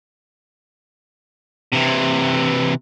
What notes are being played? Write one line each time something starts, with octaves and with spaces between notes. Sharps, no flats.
C3 E3